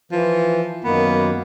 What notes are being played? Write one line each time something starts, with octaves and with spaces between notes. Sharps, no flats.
E3 F3
F#2 D#3 A#3 B3